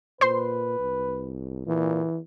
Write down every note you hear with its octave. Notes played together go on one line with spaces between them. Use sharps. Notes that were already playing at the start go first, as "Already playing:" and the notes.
A#2 B4 C5 C6
C2
A#2 E3